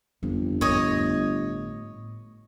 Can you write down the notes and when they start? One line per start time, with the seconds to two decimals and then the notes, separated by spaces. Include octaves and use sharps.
0.23 G1 F2
0.61 A2 C#5 D#5